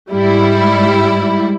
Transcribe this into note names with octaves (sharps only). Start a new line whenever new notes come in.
G#2 G3 E4